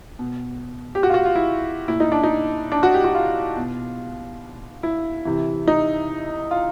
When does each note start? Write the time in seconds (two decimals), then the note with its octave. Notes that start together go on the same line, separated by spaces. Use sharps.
0.19 B2
0.95 G4
1.03 F#4
1.10 F4
1.14 F#4
1.25 F4
1.35 E4
1.88 A#2 E4
2.00 D#4
2.12 D4
2.23 D#4
2.72 D4
2.83 F#4
2.94 G4
3.04 F#4
3.15 F4
3.57 B2
4.83 E4
5.25 C3 E3
5.68 D#4
6.51 F4